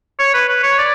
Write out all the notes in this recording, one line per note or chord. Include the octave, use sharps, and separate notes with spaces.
C#5
B4
B4
C#5
D5